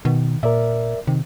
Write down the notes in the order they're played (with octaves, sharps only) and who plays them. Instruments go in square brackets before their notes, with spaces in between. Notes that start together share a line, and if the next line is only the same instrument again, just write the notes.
[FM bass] B2 [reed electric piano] D#3
[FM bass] A#2 [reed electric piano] A#4 D5 E5
[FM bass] C3 [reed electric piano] D#3